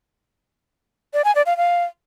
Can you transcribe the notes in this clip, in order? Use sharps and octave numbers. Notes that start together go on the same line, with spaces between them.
D5
G#5
D5
F5
F5